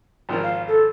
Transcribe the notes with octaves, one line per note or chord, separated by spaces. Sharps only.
G#1 F3 A#4
F5
A4